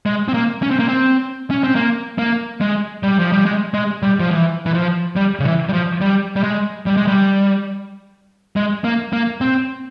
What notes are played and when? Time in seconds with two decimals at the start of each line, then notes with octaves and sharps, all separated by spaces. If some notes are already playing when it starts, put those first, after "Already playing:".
0.06 G#3
0.28 C4
0.34 A#3
0.63 C#4
0.71 C4
0.79 A#3
0.88 C4
1.51 C#4
1.64 C4
1.76 A#3
2.18 A#3
2.61 G#3
3.03 G3
3.19 F3
3.32 G3
3.46 G#3
3.74 G#3
4.02 G3
4.20 F3
4.31 E3
4.66 E3
4.74 F3
5.16 G3
5.40 C#3
5.45 E3
5.69 G3
5.73 F3
6.01 G3
6.36 G3
6.43 G#3
6.86 G3
6.97 G#3
7.08 G3
8.56 G#3
8.84 A#3
9.13 A#3
9.41 C4